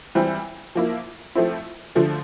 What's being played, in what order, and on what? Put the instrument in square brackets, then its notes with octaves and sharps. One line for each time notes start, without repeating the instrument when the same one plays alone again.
[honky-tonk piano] E3 G3 C4 E4
F3 A#3 E4
F3 A3 C4 E4
D3 F3 A3